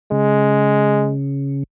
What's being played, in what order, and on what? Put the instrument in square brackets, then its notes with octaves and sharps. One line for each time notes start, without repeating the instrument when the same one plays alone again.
[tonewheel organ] C#3 [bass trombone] G#3